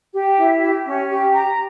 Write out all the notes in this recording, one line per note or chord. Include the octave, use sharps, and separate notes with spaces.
G4
E4
G4
C#4
G4
A#5